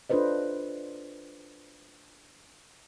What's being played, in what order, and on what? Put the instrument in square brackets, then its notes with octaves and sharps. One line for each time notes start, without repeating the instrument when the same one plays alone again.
[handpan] D4 F4 A4 B4 C5 D#5